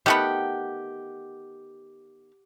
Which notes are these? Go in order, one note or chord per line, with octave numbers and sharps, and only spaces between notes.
D#3 A3 B3 G4 F#5